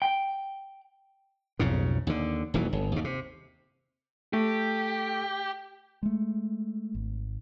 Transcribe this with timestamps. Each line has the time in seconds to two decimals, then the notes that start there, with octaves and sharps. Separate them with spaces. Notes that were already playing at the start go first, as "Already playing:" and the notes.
0.02 G5
1.59 B1 F2 G#2 C#3
2.07 D#2 D3
2.54 D#1 D#2 E3 F#3
2.73 G1
2.92 D#2 B2
3.04 C3
4.33 A3 G4
6.03 G#3 A3
6.95 G#1